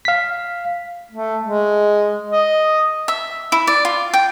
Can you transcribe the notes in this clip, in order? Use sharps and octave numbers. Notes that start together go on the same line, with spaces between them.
F5 B6
A3
G#3
D#5
E5
E4
D5
F4
G5